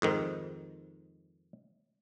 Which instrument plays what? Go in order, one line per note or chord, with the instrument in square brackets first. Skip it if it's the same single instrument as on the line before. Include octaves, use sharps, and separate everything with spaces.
[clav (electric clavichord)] F2 G#2 D#3